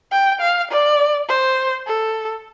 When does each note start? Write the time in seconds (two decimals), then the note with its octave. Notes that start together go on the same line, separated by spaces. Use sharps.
0.12 G5
0.41 F5
0.71 D5
1.29 C5
1.87 A4